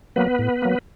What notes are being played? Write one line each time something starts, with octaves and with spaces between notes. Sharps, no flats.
F#3 A#3 B3 B4
A2
F#3 A#3